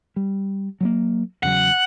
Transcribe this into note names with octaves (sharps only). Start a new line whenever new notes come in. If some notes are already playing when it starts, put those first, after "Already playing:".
G3
F#3 G3 A#3
E2 C#3 F#3 F#5